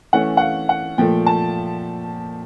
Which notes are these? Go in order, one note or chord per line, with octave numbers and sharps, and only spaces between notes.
E3 A3 C#4 F#5
F#5
F5
F#5
A#2 F3 A3 G5
A5